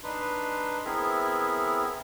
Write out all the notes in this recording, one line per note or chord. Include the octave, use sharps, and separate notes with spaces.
D4 D#4 B4 C6
B3 C4 E4 G#4 A#4 E5